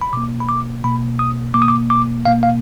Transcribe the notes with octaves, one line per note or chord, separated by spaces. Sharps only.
B5
B2 A#3 D6
B5
D6
B2 A#3 B5
D#6
B2 A#3 D6
D#6
D6
D6
B2 A#3 F5
F5